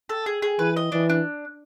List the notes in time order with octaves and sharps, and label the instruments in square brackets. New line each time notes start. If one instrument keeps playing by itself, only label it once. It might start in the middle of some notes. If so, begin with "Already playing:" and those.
[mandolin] A4
G#4
G#4
[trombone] E3 [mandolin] B4
[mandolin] D#5
[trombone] E3 [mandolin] D4
[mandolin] D4